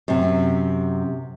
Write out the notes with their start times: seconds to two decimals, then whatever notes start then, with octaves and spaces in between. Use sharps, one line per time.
0.08 F#2 C3